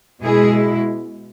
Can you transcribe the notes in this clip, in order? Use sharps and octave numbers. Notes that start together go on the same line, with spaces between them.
B2 G#3 E4 G#4